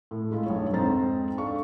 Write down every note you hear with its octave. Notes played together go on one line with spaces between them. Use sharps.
A2
G#3 E4 F4
B1 G2 C#5
F2 G#2 C4 C5 A#5 A6
D4 A4 F5 C#6